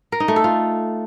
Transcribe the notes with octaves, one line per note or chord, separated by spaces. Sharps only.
A#4
D#4
A3
A4
F4